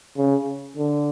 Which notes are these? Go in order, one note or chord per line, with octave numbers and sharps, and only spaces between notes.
C#3
D3